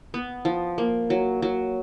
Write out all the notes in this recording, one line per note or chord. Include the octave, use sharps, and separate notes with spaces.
B3
F3
A#3
F#3
F#3